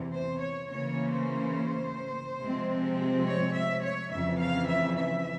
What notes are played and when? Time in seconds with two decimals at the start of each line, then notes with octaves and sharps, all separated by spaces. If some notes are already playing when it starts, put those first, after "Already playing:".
Already playing: E2 C3 E3
0.13 C5
0.40 C#5
0.69 C#3 E3 A#3 C#4 C#5
1.12 C5
2.41 C3 F3 G#3 C4
3.27 C#5
3.55 E5
3.83 C#5
4.12 F2 C#3 E3 E5
4.41 F5
4.69 E5
4.97 E5